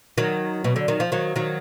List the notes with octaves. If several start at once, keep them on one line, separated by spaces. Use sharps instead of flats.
D#3 F#3
B2
D3
D#3
F3
D#3 F#3
D#3 F#3